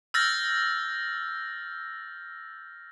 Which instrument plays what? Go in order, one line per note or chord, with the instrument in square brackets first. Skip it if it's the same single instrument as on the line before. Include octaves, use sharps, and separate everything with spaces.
[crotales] E6 F6 G6 A6 A#6